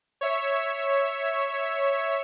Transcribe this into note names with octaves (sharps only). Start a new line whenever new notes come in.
C#5 E5